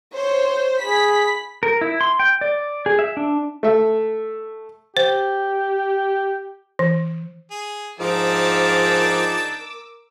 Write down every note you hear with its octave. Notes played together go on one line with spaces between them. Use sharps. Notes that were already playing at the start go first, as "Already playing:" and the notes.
C5 C#5
G#4 B5 B6
A#4
E4
C6
G5
D5
G#4
E5
D4
A3 E5
G4 C5
E3
G#4
G#2 F3 D4 D#4 A#4 A5 D6 E6